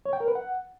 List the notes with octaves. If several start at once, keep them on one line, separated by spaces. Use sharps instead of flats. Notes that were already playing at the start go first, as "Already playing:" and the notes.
C#5
G5
A#4
B4
F#5